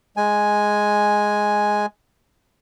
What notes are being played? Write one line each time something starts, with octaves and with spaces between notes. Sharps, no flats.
G#3 G#5